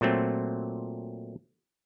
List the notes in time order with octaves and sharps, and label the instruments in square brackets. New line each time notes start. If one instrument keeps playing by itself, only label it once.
[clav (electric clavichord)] A#2 F#3 A3 C4